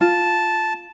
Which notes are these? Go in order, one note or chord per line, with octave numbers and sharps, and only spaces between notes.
F4 A5